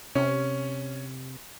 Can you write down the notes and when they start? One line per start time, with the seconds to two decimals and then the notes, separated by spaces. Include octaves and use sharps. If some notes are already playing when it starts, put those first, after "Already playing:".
0.15 C3 C#4